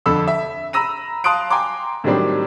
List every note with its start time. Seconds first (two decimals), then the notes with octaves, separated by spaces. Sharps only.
0.06 F2 D3 A4 B5 E6
0.28 E5
0.73 A#5 B5 E6 A#6 D#7
1.24 F5 A5 C6 D#6 F#6 D7
1.50 G5 G#5 A#5 C6 D6
2.04 A2 D#3 F#3 G3 C4 D4